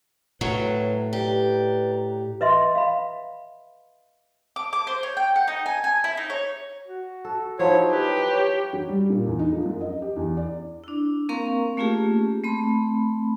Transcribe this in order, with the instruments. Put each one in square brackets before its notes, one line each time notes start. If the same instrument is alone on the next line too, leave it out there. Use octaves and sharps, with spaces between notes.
[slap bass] A2 [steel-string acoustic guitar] F#3 [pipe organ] B4 C#5
[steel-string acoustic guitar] G4 [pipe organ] B4 D5 A#5
[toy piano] B4 D#5 E5 C6
F5 B5
[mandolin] D6
D6
C5
C#5
G5
F#5
D#4
G#5
G#5
E4
D#4
C#5
[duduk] F#4
[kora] A4
[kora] F3 F#3 E4 [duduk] D#4 [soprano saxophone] C#5
[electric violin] G4 [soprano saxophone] B4
[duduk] C#5
[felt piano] F#3
G3
A#2
E2
D#4
F3
F#2
D#5
G4
E2
D5
[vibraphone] D4 E4
A#3 C4 A#4 F5 A#5 C#6
A3 A#3 C#4 F4 G4 G#4
A3 C4 B5